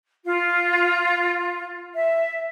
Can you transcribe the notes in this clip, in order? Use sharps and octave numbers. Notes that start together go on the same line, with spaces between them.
F4
E5